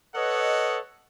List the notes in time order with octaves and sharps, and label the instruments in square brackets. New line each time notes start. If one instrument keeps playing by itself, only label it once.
[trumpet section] A4 C#5 F#5 [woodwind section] B4 D#5